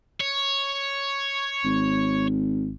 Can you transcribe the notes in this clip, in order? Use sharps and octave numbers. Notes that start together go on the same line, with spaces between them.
C#5
G#1